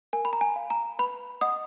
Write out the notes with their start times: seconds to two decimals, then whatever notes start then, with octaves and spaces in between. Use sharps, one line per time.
0.13 A#4 G#5
0.25 B5
0.33 A#5
0.41 G#5
0.56 F5
0.70 A#5
0.99 B4 B5
1.41 D#5 F#5 D#6